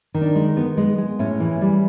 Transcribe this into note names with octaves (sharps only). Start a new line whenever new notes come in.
D#3
D4
G#3
B3
G#3
G#3
A2 C#4
E3
G3